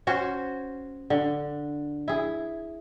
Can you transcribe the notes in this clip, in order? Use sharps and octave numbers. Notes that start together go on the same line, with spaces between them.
C#4 F#4 C5
D3
E4 G#4